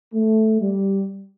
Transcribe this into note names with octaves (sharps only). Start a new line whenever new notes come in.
A3
G3